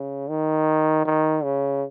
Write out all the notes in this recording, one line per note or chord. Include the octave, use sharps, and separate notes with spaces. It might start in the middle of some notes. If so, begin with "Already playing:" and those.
Already playing: C#3
D#3
D#3
C#3